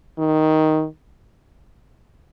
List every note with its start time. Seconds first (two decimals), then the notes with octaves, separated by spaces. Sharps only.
0.18 D#3